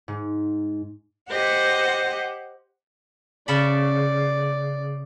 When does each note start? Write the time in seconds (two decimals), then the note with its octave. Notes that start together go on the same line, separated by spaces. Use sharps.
0.08 G#2
1.30 G4 C5 D#5 F#5
3.48 C#3 D5 A5 B5